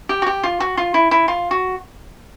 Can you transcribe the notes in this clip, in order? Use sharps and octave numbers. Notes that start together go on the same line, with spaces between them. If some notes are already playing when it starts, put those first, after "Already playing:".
G4
F#4
G4
F4
F#4
F4
E4
E4
F4
F#4